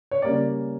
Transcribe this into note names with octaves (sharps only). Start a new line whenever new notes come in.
C#5
C#3 G3 A#3 C#4 D5